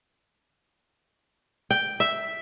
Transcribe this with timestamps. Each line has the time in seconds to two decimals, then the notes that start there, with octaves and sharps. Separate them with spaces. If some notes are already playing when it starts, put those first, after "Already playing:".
1.70 G5
2.00 E5